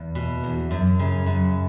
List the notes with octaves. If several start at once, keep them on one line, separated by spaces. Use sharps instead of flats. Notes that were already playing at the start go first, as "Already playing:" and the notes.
Already playing: E2
B2
E2
F#2
C#3
F#2